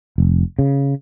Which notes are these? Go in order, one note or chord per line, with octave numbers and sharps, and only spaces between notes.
F1
C#3